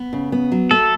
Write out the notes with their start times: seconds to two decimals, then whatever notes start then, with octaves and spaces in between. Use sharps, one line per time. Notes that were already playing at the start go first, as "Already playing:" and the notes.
Already playing: B3
0.13 C#3
0.32 B3
0.52 F#3
0.71 A3 A4